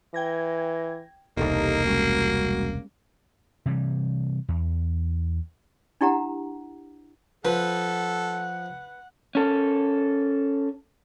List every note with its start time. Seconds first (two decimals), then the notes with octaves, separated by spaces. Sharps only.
0.14 E3 G5 G#6 A#6
1.37 E1 C2 A#3 D#4 G4 A4
1.85 G3 G#3 C#4 F#4
3.66 C3 E3 G3
4.48 E2
6.01 D4 E4 G4 F#5 A#5
7.45 F3 A4 B4 F#5
9.35 C#4 A4 A#4